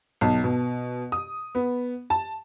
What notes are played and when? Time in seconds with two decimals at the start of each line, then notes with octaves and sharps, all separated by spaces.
0.21 B1
0.44 B2
1.12 D#6
1.55 B3
2.10 A5